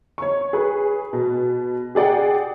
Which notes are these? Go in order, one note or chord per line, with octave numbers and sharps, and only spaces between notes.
C#5 C#6
G#4 B4
B2
G4 G#4 D5 F#5 G5